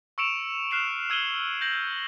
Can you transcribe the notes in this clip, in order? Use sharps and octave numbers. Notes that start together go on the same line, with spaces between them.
C#6 E6 C#7 D7 E7 F7
F6 F#6 C7 E7 F7
E6 G#6 D#7 F#7 G7
G6 A#6 F#7